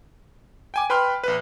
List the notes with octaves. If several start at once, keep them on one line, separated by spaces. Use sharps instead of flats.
G5 G#5 D6
B4 G5 B5 C6 F6
A#1 B4